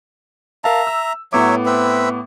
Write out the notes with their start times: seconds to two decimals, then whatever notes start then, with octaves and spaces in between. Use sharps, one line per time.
0.64 A#4 E5 F5 A5 A#5
0.87 E6
1.33 A2 F#3 B3 C#5 E5 D6
1.66 C4 B4 E5